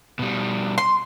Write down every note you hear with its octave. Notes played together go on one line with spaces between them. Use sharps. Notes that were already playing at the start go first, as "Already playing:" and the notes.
B2 G3
C6